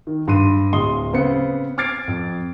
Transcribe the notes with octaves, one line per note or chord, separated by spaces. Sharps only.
D#3
G2 C6 D#7
D1 D#5 C6 D#6 G7
C#3 B3 C4 C#7
D6 F6 G#6 A6 C7 D7
F2